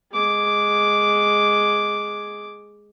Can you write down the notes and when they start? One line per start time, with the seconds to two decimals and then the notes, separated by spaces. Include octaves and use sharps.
0.12 G#3 D6